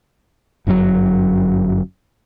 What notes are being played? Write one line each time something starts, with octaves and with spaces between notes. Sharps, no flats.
G1 F#2 D3 F#3